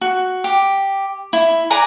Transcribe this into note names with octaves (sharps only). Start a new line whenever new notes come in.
F#4
G4
E4
B4 D5 G#5 A#5